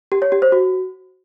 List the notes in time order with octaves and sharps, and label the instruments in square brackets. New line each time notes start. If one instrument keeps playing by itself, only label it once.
[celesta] G4
C#5
G4
C5
F#4